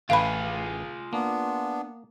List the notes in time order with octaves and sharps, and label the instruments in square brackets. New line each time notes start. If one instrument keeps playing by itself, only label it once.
[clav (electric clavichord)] A1 A3 B4 [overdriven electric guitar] F4 G#4 [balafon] F5 B5
[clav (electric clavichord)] A#3 [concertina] B3 D4